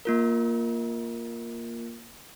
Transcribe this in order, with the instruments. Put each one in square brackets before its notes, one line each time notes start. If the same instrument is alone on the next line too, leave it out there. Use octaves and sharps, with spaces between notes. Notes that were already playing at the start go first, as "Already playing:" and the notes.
[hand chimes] A#3 F4 A#4